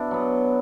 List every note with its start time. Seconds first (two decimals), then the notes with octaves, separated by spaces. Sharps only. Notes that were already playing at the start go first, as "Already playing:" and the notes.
Already playing: B2 D4 E4
0.11 F#3 B3